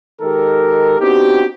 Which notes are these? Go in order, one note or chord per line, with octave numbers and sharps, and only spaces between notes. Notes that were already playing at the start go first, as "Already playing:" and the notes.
D#3 G#3 G4 A4 A#4
B3 C4 D4 D#4 F#4 G4